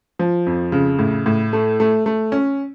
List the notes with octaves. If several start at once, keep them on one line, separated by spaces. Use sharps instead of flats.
F3
F2
C#3
A2
A2
A3
A3
A3
C#4